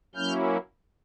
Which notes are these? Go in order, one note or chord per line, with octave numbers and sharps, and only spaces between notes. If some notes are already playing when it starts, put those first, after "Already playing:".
F#3 A#3 C#4 E4 F6 G6